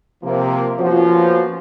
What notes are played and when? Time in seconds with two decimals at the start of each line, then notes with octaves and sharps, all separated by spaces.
0.24 C3 F3 A#3
0.79 F3 A#3 B3 C#4 F4 F#4